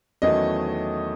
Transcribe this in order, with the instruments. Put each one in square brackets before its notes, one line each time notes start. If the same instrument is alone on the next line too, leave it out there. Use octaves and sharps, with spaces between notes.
[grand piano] E2 D#3 F#3 A3 C#4 [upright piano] D#5